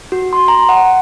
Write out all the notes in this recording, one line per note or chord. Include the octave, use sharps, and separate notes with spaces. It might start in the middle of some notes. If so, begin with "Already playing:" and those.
F#4
C6
A#5
F#5